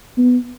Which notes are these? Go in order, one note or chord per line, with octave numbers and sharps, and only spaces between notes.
B3